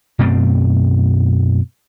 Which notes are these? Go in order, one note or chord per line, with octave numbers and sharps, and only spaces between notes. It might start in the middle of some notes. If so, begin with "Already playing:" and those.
F#2 B2 A3 C4